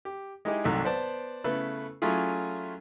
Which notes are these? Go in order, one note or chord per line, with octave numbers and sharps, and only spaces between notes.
G4
G#3 D#4 E4 G4 G#4
C2 G#2 C3 D#3 F#3 A3
B3 C5 D5 A5
C#3 A3 B3 E4 A4 B4
F#3 A3 C#4 E4 F4 G#4